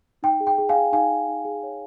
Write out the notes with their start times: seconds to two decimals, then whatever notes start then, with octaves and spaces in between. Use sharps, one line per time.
0.23 D#4 G5
0.40 G#4
0.47 G5
0.58 G#4
0.69 F5 G#5
0.75 G#4
0.92 D#4 F5 G#5
1.11 D#4
1.28 D#4
1.45 G#4
1.63 C#5